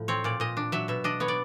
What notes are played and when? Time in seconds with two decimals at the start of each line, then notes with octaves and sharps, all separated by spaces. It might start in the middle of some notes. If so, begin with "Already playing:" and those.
Already playing: A2 F3
0.08 C4 C#5
0.24 A#2 D5
0.40 A#2 D#5
0.57 D4
0.72 F#3 E5
0.88 B2 E5
1.04 D4 D#5
1.20 B3 C#5
1.28 D5